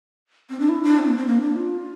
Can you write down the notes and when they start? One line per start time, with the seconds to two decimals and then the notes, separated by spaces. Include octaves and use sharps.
0.50 C4
0.60 D4
0.69 E4
0.83 D4
0.99 C4
1.08 A#3
1.17 C4
1.27 A#3
1.41 D4
1.56 F4